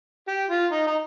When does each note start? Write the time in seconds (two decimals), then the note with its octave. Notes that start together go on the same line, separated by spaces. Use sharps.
0.28 G4
0.51 F4
0.72 D#4
0.87 D#4